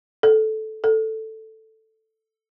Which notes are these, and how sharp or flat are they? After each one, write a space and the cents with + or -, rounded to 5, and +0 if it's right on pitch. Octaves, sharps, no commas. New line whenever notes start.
A4 -10
A4 +5